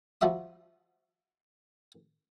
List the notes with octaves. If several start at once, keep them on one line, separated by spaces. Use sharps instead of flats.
F3 G3 F#4 E5 D#6